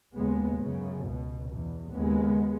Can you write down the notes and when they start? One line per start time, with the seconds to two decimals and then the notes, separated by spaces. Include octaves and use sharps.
0.16 D#2 C#3 G#3 B3
0.61 F#2 C#3
1.05 C#2 B2
1.49 E2 B2
1.93 D#2 C#3 G#3 B3